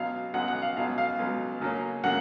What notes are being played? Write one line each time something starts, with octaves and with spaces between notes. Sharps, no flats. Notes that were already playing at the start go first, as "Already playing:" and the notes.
Already playing: C#2 B2 F#3 F5
C#2 B2 F#3 F#5
F#5
F5
C#2 B2 F#3 F5
F5
C#2 B2 F#3
C#3 F#3 A#3 C#4
C#3 F#3 A#3 C#4 F#5